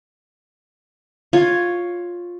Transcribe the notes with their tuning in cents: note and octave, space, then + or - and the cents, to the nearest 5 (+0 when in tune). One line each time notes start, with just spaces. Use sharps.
F4 +10 C#5 +0